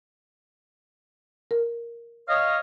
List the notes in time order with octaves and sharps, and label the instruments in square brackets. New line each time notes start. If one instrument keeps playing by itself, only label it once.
[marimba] A#4
[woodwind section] C#5 D#5 F5